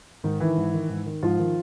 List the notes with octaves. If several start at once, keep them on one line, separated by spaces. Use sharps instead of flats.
G#2 D#3 D#4
D#3 E3 E4
G#2
D#3
G#2
D#3
G#2 F3 F4
D#3